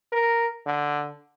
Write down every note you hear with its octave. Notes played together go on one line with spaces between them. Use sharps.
A#4
D3